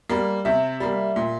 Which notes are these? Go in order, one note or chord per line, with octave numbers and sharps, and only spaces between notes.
G3 A#3
C3 E5
G3 A#3
A#2